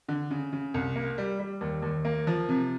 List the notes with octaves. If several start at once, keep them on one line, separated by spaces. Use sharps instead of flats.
D3
C#3
C#3
C2
A#3
G3
G3
D#2
D#2
A#3
F3
C3